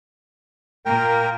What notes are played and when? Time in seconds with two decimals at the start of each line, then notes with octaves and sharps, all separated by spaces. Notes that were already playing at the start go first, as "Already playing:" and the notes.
0.85 A#2 A#3 A#4 G5